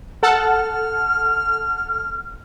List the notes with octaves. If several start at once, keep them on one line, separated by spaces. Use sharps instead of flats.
A4 F#5 A5 F6